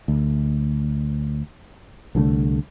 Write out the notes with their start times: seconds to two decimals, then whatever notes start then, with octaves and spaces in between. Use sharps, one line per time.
0.08 D2
2.15 C2 D3 E3 A3